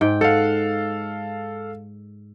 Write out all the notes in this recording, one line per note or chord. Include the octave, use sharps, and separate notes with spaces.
G#2 G5
A4 F5 F#5